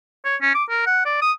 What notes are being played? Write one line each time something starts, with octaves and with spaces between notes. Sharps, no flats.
C#5
C#4
D6
A#4
F#5
D5
D#6